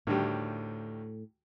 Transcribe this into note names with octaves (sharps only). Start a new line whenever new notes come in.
D2 A2 D#3 G3